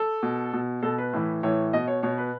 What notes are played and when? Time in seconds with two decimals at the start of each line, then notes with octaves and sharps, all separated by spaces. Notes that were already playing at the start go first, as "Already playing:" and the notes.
Already playing: A4
0.23 B2
0.53 B2
0.83 B2 A4
0.98 B4
1.13 A2 E3
1.43 A2 E3 C#5
1.73 B2 D#5
1.88 C#5
2.03 B2 C#5
2.18 B4